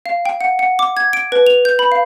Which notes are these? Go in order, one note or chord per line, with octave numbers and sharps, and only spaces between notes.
F5
G5
F#5
F#5
D6
G#6
D7
B4
F7
G6
B5
F5